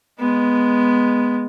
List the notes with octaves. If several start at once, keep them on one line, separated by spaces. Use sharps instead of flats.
G#3 B3